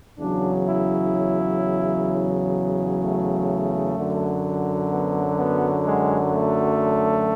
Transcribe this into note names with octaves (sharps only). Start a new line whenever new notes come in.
E2 C#3 F#3 D4
E4
A3
F#2 D3 F#3
B3
B3
G#3
A3